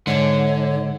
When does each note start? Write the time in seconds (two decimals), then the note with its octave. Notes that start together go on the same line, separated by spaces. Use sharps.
0.07 G#2 D3 C#5